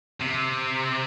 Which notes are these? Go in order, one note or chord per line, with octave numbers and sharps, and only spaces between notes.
C3